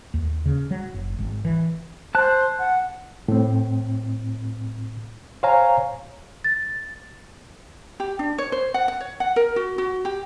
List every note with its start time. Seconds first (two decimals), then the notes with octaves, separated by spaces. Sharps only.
0.14 D#2
0.46 C#3
0.71 F#3
0.94 F#1
1.19 G#1
1.45 E3
2.15 C5 A5 F#6
2.59 F#5
3.28 A2 C4
5.43 C5 C#5 F5 G#5 A#5
6.44 A6
8.00 G4
8.19 D4
8.38 C#5
8.52 C5
8.74 F#5
8.88 F#5
9.00 C#5
9.20 F#5
9.36 A#4
9.56 F#4
9.78 F#4
10.05 G4